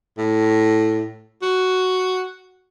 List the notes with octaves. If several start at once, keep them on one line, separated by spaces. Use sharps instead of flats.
A2
F#4